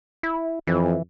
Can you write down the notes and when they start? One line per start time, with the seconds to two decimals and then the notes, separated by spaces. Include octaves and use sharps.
0.23 E4
0.67 F2 E3